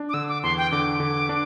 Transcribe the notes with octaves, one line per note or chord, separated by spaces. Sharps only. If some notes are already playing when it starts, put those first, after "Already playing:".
Already playing: D4
D6
D3 E6
D6
E2 C6
G5
D3 D6
D3
D4